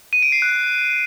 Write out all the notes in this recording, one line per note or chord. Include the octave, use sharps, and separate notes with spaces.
D#7
D7
C7
F#6